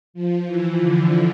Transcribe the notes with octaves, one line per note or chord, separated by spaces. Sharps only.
F3
E3
D3